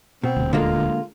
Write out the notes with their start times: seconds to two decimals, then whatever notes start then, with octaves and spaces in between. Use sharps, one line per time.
0.24 B2 C4
0.37 D#1 D2
0.53 D3 G#3 A#3 F4